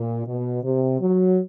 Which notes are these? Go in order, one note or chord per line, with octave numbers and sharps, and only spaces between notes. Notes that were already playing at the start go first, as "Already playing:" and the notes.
Already playing: A#2
B2
C3
F#3